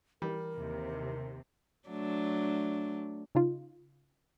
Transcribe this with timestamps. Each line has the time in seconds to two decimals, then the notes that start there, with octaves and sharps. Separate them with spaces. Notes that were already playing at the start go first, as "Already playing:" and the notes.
0.22 E3 G3 A#4
0.57 D#2 C3
1.89 F#3 A3 D4
3.35 C#3 D#4 F4